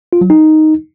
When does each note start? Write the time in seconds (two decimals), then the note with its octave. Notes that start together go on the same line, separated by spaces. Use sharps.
0.13 F4
0.21 F#3
0.30 D#4